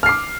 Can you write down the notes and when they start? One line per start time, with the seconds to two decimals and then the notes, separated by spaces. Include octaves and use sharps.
0.03 F6
0.06 C7
0.09 D6